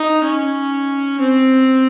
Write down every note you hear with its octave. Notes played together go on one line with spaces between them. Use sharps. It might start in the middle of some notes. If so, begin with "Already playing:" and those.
Already playing: D#4
C#4
C4